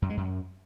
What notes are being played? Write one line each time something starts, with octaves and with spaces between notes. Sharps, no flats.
F#2
G#3
F#2